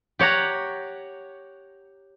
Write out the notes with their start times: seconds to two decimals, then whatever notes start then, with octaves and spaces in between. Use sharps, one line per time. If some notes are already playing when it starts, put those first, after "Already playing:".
0.19 G4 C#5 F#5 A#5